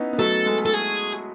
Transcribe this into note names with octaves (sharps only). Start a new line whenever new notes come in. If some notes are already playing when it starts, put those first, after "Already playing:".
Already playing: B3 C#4 D#4 E4
B3
F#3 A3 A4
G#3
A4
G#4